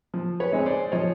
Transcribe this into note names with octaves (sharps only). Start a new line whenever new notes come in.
F3
B4 C#5
G#3 C4 D#4
C5 D5
F3 C#5 D#5